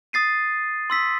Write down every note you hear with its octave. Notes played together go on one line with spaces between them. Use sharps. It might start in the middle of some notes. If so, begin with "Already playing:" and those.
D#6 A6 C7 D#7
C6 E6 B6